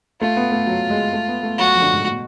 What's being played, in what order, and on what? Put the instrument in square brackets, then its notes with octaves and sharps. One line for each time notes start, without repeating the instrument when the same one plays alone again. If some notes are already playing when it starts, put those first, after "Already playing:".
[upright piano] A3 [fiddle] F4
[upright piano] B3
A3
F#3
G#3
A3
B3
A3
[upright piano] F#3 [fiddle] F#4
[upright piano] F3
D3
G#2
A2
B2